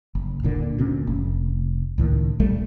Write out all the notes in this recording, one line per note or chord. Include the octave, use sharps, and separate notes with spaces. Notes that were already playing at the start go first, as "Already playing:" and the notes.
F#1
D1 A#2 D3
D2 A#2 C#4
F1
C#2 A2 D#3
D1 A#1 G3 A3